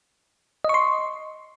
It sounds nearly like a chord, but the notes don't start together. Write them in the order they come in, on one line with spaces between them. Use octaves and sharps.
D#5 C#6 C6